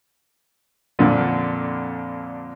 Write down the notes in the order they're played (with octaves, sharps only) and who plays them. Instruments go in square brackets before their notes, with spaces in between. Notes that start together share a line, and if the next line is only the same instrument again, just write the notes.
[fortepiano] F2 A#2 D3